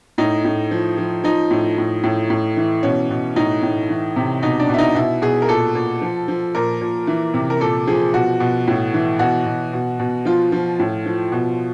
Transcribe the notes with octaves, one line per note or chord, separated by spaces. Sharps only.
A2 D#4
A2
F3
F3
F3 D#4
A2
A2
A2
A2
E3
B2 C#4
B2
A2 D#4
A2
E3
C3
B2 D#4
D4
B2 E4
D#4
B2 E4
B2 G#4
A#4
A#2 A4
A#2
F3
F3
A#2 A#4
A#2
E3
C3
A#4
A#2 A4
F3 G#4
B2 F#4
B2
A2
E3
B2 F#4
B2
B2
B2
F3 F4
F3
A2
F3
B2